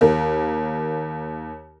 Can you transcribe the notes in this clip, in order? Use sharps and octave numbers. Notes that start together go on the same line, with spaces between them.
D#2 A#4